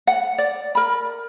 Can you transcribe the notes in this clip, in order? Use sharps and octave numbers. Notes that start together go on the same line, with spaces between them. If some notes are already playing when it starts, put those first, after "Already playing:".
F#5
D5
A#4 B5